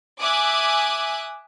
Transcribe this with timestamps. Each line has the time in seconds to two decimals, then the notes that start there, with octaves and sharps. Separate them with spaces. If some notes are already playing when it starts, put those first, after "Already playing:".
0.20 E5 G#5 D6 D#6 F#6